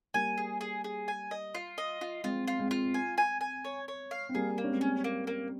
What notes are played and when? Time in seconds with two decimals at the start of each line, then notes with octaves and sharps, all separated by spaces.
0.14 G3 A#3 G#5
0.38 G#4
0.61 G#4
0.84 G#4
1.08 G#5
1.31 D#5
1.55 F4
1.78 D#5
2.01 F4
2.24 G#3 C4 F4
2.48 F4
2.59 G#3 C4
2.71 F4
2.94 G#5
3.18 G#5
3.41 G#5
3.65 C#5
3.88 C#5
4.11 F5
4.29 C4
4.34 G3 A#3 G#4
4.58 A#3
4.64 C#4
4.70 G#3 C4
4.81 C#4
5.04 A#3
5.27 A#3